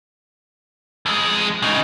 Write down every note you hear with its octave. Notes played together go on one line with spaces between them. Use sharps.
F2 G#3
C#3 D#4